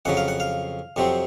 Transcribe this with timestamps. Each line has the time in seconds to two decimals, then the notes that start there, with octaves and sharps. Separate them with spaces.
0.05 F2 C#3 F#3 F#5
0.17 F5
0.28 F#5
0.40 F5
0.96 F2 C3 F#3 C4